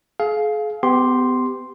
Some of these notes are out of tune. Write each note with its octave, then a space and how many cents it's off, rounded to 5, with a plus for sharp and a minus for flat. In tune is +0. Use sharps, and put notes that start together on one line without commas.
G#4 +40 F5 +0
B3 +35 G4 +0 C6 +0